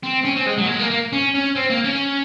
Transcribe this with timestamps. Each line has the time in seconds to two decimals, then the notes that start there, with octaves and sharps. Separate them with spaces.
0.04 C4
0.25 C#4
0.36 C4
0.47 G#3
0.58 F#3
0.65 A#3
0.69 G#3
0.79 A#3
0.90 A#3
1.13 C#4
1.35 C#4
1.56 C4
1.70 A#3
1.84 C#4